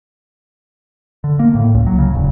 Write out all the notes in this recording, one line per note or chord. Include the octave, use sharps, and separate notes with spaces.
D3
A#3
A2
C#2
F#3
C#3
E1